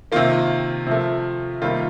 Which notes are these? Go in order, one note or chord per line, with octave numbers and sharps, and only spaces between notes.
C3 D#3 A#3 F4
C3 F3 A3
C3 D#3 G3 A#3 F4